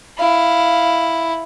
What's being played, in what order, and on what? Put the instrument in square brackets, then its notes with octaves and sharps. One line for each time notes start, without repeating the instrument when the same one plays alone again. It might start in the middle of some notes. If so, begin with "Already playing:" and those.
[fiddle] E4 [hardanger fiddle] F5